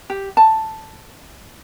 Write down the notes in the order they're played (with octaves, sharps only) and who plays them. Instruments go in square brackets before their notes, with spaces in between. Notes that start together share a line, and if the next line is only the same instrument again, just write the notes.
[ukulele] G4
A5